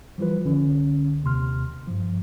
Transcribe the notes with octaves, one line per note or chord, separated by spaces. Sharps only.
E3 F3 G3 F4 B4
C2 D3 C#4
D#2 C3 C6 F6
G2 F3